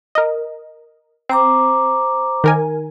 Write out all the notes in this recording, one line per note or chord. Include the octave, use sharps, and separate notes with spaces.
A#4 D#5
C4 C5 A#5 D6
D#3 A#4 G#5